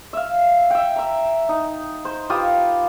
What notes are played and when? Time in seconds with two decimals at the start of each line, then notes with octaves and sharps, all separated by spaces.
0.13 E5 F5
0.70 E5 G5
0.96 E5 A#5
1.49 D#4
2.05 C5
2.30 F4 G4 B4 D#6